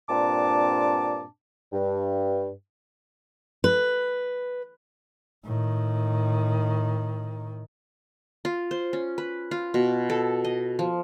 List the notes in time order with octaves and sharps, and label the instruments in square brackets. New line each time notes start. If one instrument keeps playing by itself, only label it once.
[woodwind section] G2 A#2 C4 D4 A5 D6
G2
[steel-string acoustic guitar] B4
[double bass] A2 D#3
[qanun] F4
C5
C#4
B4
F4
B2
A4
D#5
F3